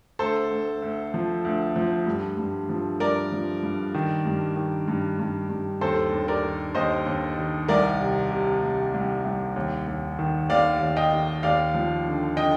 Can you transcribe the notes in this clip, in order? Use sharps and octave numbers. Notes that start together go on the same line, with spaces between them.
D2 A4 C5
D2
D2
F3
D2
F3
G2
G2
F3
G2 A#4 D5
F3
G2
D#3
G2
D#3
G2
G2
G2
D#2 A4 C5
D#2
A#4 D5
D#3
D#2 C5 D#5
D#2
D#3
C2 A#4 D5
C3
C3
C2
C2
C2
D#2
D#2
D#3
D#2 D5 F5
D#2
D#5 G5
D#3
D#2 D5 F5
F3
D3
D3 D#5 G5